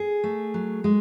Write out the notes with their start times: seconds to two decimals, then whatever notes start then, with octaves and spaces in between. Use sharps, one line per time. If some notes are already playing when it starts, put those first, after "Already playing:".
Already playing: G#4
0.24 A3
0.54 F#3
0.84 G#3